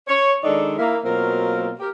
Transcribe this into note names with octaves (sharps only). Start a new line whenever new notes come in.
C#5
D#3 G#3 D4 D#4 A4 D5
A#3 E4
B2 F#3 A#3 C4 F4 A#4
G4 A#4